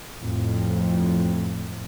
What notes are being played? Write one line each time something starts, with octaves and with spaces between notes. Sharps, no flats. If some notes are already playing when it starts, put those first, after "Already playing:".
F2 A2